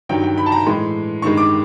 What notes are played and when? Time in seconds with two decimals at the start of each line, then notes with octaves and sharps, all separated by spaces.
0.09 G2 D#3 F#3 G5
0.24 G5
0.37 B5
0.46 A5
0.52 A#5
0.67 A2 E3 G#3 C6
1.22 G2 D#3 G#3 C#6
1.37 D6